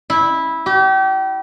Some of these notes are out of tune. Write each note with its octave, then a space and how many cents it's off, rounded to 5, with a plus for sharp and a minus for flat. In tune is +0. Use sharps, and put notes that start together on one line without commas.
E4 -15
G4 -35